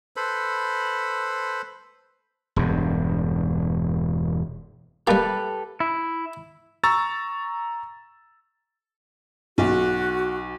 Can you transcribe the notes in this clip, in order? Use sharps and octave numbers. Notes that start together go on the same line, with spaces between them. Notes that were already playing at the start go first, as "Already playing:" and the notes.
A4 B4 C5 B5
E1 G2
G3 A#3 G4 A4 B4
E4
A#5 C#6 E6 A6
B1 F#4